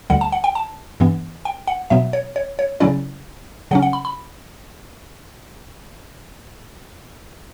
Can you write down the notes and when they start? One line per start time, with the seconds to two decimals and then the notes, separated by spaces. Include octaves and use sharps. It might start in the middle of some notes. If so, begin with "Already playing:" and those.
0.10 D2 D3 G3 F#5
0.21 A5
0.32 F#5
0.44 G5
0.55 A5
1.00 G2 E3 B3
1.45 G5
1.67 F#5
1.90 B2 F#3 B3 E5
2.13 C#5
2.36 C#5
2.59 C#5
2.80 C#3 F#3 C#4 E4 D5
3.71 C#3 F#3 C#4 F#5
3.82 F#5
3.93 B5
4.05 B5